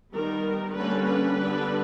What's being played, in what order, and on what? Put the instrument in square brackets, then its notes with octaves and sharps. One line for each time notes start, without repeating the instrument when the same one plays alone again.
[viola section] D#3 G3 B3 A#4
D3 G3 A#3 C#4 B4
B4
D3 G3 B3 D4